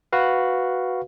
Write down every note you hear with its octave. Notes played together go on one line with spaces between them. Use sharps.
F#4 B4 F5